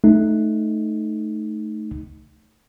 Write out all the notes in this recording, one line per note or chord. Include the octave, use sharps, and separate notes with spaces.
A3 D#4